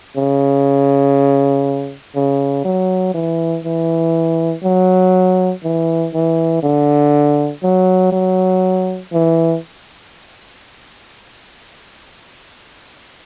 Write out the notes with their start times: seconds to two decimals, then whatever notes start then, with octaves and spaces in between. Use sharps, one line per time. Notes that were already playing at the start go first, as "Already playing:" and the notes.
0.16 C#3
2.15 C#3
2.64 F#3
3.14 E3
3.64 E3
4.63 F#3
5.63 E3
6.14 E3
6.63 D3
7.63 F#3
8.12 F#3
9.12 E3